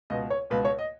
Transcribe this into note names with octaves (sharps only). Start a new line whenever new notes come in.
C#2 B2 D#5
C#5
C#2 B2 B4
C#5
D#5